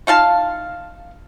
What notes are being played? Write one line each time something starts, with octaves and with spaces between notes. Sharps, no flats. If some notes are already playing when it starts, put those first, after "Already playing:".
D#4 F4 F5 A5